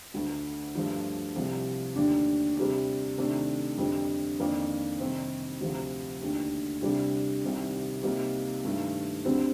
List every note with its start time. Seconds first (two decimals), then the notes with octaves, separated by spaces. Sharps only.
0.14 D2 D3 A3
0.75 G2 F3 A3
1.35 C2 C3 F3
1.96 D#2 D3 A3 D4
2.56 C3 G3 D4
3.18 C3 D#3 A3 D4
3.78 F2 D3 G3
4.39 F2 D#3 A#3 D4
5.00 C3 D#3 G3 C4 D#4
5.60 D2 C3 F3
6.21 D#2 D3 A3
6.81 C2 C3 G3 D4
7.43 C2 C3 D#3
8.03 C3 G3 A#3 D#4
8.64 G2 D#3 A3
9.25 D2 D3 G3 C4